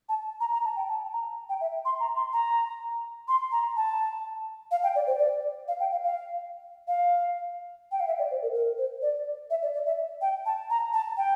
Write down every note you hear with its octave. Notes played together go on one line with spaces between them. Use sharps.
A5
A#5
A#5
A5
G5
A5
A#5
G5
E5
C6
A#5
C6
A#5
C6
A#5
A5
F5
G5
D5
C5
D5
F5
G5
F5
F5
F5
G5
F5
E5
D5
C5
A#4
A#4
C5
D5
E5
D5
D5
E5
G5
A5
A#5
A5
G5